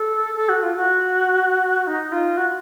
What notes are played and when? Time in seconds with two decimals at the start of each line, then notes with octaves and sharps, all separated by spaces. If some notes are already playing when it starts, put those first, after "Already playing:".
Already playing: A4
0.35 A4
0.49 F#4
0.63 F4
0.76 F#4
1.87 D#4
2.12 F4
2.37 F#4